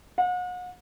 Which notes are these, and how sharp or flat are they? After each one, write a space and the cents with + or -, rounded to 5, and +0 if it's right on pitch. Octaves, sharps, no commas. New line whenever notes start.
F#5 -40